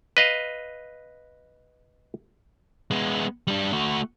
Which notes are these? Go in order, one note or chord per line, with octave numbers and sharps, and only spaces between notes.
B4 D#5 F5
G#3 B3
G3 D4
A3 F#4